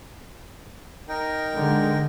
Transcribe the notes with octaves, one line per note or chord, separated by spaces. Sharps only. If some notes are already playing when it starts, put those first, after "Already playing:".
D#4 A#4 G5
D3 G#3